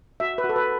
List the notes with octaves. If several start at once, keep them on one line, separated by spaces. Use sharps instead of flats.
F#4 E5
B4
F#4
A4
B4